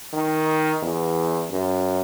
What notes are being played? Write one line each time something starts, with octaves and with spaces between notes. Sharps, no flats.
D#3
E2
F#2